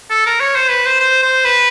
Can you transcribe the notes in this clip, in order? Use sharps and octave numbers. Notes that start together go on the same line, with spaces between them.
A4
A#4
C#5
C5
B4
C5
C5
C5
B4